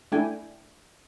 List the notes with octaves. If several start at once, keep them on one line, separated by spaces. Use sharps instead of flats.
A3 D4 E4 G5 G#5